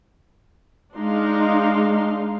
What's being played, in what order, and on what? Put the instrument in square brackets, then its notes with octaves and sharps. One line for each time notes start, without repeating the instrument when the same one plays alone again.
[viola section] G#3 D4 D#4 F5 C6